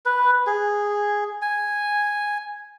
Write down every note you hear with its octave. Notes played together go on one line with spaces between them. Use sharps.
B4
G#4
G#5